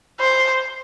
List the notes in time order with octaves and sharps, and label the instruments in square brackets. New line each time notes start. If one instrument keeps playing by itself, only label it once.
[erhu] C5